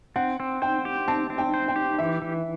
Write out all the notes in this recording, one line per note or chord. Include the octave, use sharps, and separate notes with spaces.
C4 F#5
C4
C5 G5
G4
C4 A5
C4
G5
C5
G5
G4
E3 E5
E3